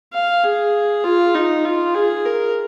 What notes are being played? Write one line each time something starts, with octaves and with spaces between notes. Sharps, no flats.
F5
G#4
F4
D#4
F4
G#4
A#4